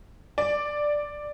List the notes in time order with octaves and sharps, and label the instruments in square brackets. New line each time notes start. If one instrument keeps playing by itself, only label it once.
[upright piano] D5